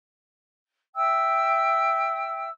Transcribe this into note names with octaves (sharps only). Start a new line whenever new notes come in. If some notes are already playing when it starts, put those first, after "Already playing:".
E5 G5 E6